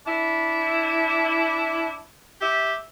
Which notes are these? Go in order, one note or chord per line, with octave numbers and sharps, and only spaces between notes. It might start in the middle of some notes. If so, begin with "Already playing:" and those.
D4 E4
G4 E5